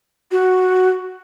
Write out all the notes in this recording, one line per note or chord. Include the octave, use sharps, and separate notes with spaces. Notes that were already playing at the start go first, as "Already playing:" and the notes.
F#4